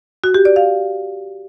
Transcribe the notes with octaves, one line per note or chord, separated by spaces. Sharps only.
F#4
G4
D5
F5